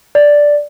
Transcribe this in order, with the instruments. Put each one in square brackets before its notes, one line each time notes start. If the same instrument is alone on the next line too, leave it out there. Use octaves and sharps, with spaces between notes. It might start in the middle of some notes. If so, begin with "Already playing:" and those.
[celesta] D5